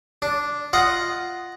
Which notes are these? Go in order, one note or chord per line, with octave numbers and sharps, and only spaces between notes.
D4
F4 D#5 F#5